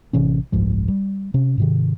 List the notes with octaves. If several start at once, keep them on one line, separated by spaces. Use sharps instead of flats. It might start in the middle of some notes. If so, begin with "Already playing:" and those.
A1 C3 E3 C#4
F#1 C2 G#2 F3
G3
C3 C#4
G#2 C3 D#3